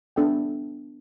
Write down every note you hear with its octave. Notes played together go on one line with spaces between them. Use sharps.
B3 D4 A4 E5 G5